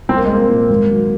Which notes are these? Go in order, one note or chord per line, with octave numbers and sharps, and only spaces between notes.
C2 C4
A#3
G#3
A#3 C4
A#2
G#1
F#3